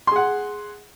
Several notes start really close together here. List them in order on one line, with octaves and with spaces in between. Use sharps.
C6 G#4 F#5